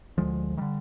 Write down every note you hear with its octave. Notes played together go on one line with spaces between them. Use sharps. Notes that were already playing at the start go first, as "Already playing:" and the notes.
D2 D3 F3 G#3
D3 D#3 G3